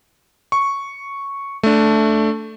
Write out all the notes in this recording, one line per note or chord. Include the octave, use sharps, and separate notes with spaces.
C#6
A3 D4